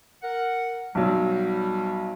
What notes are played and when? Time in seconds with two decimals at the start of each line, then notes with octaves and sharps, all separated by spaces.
0.22 A#4 F#5
0.95 B1 F#3 G3